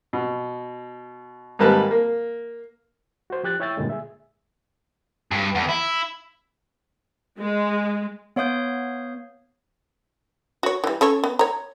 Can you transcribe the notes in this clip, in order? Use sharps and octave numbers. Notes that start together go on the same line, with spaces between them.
B2
G#2 D#3 G3 A#3 B4 A5
A#3
F#4 C5
F3 G4 F#6 A6
E4 C#5 E5 G5 E6 A6
G2 A#2 D3 G#3
G#4 E5
G2
E2
E4
G#3
B3 C#5 F5 D#6 G6
F#4 C#5
E3 G3
C#4 A4 C#5
B3
C#5 A#5